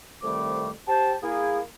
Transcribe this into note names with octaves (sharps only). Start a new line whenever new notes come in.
C2 F2 D#3 G3 A3 D6
G4 C5 A5
A#3 E4 G#4